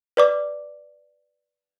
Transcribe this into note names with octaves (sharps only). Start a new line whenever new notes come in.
B4 D5 D6